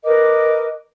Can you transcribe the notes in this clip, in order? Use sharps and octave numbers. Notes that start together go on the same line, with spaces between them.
A#4 B4 D#5 D6